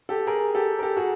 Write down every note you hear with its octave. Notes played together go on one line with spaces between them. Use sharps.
G4 A4
G#4 A#4
G4 A4
A#4
G4 A4
F#4 G#4